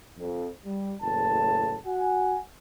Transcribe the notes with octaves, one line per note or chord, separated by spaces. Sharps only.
F2
G3
F#1 E2 A2 A5
F#4 F#5 G#5